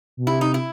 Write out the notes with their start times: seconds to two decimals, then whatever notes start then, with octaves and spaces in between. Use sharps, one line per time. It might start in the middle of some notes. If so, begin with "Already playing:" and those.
0.17 B2
0.27 C3 E4
0.41 D#4
0.54 E4